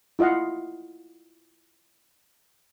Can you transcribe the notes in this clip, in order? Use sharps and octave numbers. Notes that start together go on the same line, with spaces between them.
E4 F4 D#5 F5 F#5